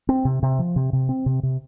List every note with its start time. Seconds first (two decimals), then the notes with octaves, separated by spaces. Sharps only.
0.09 C4
0.25 C3
0.43 C3
0.59 F3
0.76 C3
0.93 C3
1.09 C4
1.26 C3
1.43 C3